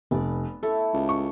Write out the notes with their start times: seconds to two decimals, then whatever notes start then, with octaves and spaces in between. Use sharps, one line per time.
0.11 F1 B3 D5
0.63 A3 E4 A4 C#5
0.93 C#2
1.09 C#6